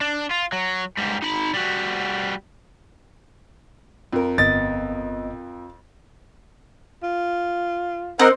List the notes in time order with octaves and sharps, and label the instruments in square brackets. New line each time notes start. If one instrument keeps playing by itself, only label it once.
[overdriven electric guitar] D4
F4
F#3
G#2 G3
D#4 B5
G3 F#4
[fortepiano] F2 A#4
[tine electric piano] G1 B3 D#5 [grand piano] A6
[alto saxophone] F4
[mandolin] C4 [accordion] A#4 D#5 F#5 [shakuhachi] C5